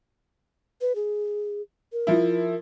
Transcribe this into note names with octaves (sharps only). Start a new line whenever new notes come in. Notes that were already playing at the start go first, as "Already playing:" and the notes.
B4
G#4
A#4
F3 E4